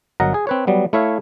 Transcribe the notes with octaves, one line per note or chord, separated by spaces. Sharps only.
G1 F#3 A#4 D#5 F#5 A#5
G#4
C4 B4 C#5
F#3 G3 B3
A3 E4 C#5 E5 F5